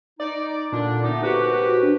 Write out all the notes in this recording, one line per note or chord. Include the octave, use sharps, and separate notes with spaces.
D#4 D5
A#2 D3 D4
A3 B3 D#4 D6
C2 F#4 G4 B4
D4